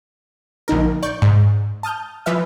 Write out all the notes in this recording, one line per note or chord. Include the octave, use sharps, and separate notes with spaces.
A#1 D3 D#4 A#4
D5 C#6 G6
G#2
A5 D#6 F6 G6
E3 F3 B4 E5 F6